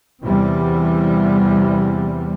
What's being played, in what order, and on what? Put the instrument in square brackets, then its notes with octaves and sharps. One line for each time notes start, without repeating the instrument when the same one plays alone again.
[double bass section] E2 C3 E3 G3